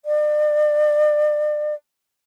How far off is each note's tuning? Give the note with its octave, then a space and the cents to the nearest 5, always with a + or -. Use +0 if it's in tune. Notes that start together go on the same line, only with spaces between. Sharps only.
D5 +35